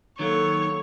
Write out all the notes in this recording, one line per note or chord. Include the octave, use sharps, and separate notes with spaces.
D#3 F#3 A#3 A4 C#5